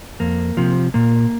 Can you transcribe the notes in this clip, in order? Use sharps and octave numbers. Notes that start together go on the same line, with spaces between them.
F2 A#3
C3 F3
A#2 A#3